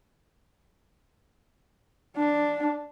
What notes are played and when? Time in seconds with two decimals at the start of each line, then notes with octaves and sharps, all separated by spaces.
2.16 D4